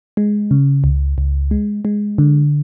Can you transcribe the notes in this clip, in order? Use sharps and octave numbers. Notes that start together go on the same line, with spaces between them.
G#3
C#3
C#2
C#2
G#3
G#3
D3